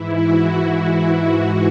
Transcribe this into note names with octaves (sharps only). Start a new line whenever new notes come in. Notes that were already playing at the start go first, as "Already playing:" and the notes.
Already playing: G#2 E3 E4
F#4
F#4
E4
G#2 E3 F#4